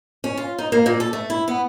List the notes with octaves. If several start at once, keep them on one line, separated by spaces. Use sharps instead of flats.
C#4
F4
D#4
A#3
A#2
A4
A3
E4
B3